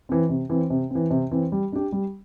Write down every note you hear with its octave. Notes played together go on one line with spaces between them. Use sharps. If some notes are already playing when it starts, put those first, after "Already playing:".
E3 C4
C3
E3 C4
C3
E3 C4
C3
E3 C4
G3
D4 G4
G3